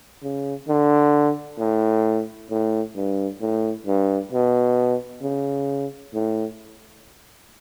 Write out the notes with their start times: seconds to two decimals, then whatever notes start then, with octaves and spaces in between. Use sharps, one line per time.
0.23 C#3
0.68 D3
1.59 A2
2.50 A2
2.96 G2
3.41 A2
3.86 G2
4.32 B2
5.22 C#3
6.14 A2